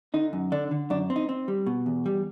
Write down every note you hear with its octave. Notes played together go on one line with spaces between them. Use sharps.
D3 D#4
F#2
D3 D4
D3
F#2 D4
C4
D#4
C4
G3
B2
E2
G3